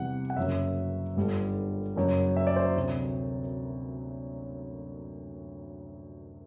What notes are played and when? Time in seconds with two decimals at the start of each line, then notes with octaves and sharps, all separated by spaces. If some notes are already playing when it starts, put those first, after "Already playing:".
Already playing: E2 C3 E3 G3 F#5
0.30 F#5
0.37 F#1 F#2 F#3 E5
1.17 G1 G2 D3 G3
1.96 F#1 F#2 F#3
2.37 E5
2.47 D5
2.56 C5
2.76 D2 C3 F#3